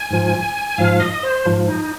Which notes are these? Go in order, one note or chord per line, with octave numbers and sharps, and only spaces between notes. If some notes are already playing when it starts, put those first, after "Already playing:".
Already playing: G#5
G#2 F3
G#2 F3 F5
D#5
C5
G#2 F3
D#4